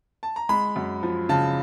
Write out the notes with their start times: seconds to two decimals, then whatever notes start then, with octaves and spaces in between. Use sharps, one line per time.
0.23 A5
0.36 A#5
0.49 G#3 B5
0.76 F#2
1.03 F3
1.29 C#3 A5